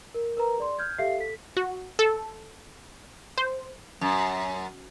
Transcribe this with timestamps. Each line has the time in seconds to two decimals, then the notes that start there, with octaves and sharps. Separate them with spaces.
0.15 A#4
0.37 A#4 B4 A#5
0.58 G#4 D5 C6
0.79 F6 G6 G#6
0.98 G4 A4 E5 F5 C7
1.19 A4 B6
1.57 F#4
1.99 A4
3.38 C5
4.01 F#2